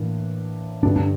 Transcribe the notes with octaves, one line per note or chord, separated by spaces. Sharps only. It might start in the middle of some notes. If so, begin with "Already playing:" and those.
Already playing: A2 E3 A#3 D4
G2 D3 G3 D4
D4